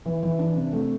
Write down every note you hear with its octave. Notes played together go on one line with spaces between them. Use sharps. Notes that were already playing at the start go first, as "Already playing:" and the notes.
E3
E3
D4
C3
A3